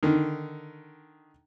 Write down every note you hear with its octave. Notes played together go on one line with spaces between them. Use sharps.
D3 D#3